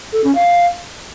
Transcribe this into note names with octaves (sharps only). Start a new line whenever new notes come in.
A4
C#4
F5